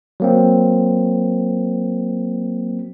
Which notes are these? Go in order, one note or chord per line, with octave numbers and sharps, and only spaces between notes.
F#3 A#3 C4